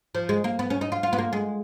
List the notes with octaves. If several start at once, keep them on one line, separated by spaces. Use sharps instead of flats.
F3
G#3
A#3
B3
C#4
D#4
F4
F4
B3
A#3
G#3